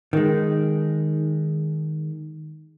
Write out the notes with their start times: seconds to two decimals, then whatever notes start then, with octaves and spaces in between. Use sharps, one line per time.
0.13 D#3 G#3